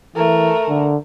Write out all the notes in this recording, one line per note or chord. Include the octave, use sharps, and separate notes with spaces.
E3 A3 A#4
D3